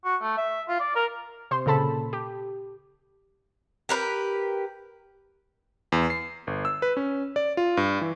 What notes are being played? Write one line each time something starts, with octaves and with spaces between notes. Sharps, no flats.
F#4
A3
E5
F4
D5
A#4
C3 C5 C6
A#2 C#3 A4 A5 B5
G4
G4 A#4 B4
E2
C7
G1
E6
B4
C#4
D5
F4
G2
E3